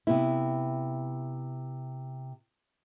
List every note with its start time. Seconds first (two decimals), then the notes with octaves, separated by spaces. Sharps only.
0.07 C3 B3 E4